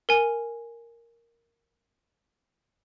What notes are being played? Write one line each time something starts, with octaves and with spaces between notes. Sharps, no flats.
A#4 G#5